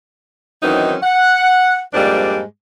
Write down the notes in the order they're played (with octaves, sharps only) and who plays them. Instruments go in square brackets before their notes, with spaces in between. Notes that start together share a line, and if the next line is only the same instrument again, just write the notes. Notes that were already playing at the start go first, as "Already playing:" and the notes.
[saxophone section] D#3 E3 F#3 C4 C#4 D#4
F#5
F2 G#2 G3 G#3 A#3 D4